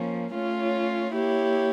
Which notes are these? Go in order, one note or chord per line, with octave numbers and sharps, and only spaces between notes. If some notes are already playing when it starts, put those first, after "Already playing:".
Already playing: F3 A#3 C#4
A3 C#4 F4 C#5
A#3 E4 G4 C#5